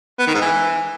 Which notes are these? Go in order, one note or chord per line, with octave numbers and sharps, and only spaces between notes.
B3
D#3
G#2
E3